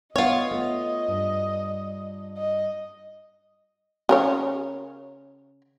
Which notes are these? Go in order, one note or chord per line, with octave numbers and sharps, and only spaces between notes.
B3 F4 C#5 D#5 F#5
A3 B3
G2
D#5
C#3 A#4 C#5